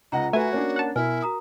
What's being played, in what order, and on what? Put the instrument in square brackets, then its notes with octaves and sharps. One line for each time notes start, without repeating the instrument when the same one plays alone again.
[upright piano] C#2 F#5 [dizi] D#5 [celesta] A#5
[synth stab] A3 G#5 [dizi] F#4 [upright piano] B4 E5
[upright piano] A#3 C#4 D4 [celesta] C#5
[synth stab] F#5 A5
[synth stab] B2 [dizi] E4 [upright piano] A#4 [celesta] G#5 F6
[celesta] F#4 A#5 D#6